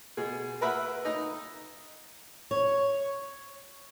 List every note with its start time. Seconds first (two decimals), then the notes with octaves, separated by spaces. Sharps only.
0.17 B2 G#4
0.61 A#4 B4 E5 F#5 B5
1.05 D#4
2.51 C#5